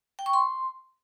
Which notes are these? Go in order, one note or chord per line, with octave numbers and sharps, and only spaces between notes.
G5
C#6
C6